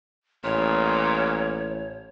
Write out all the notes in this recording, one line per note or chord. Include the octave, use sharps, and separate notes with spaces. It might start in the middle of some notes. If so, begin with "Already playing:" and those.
A1 A#2 C#5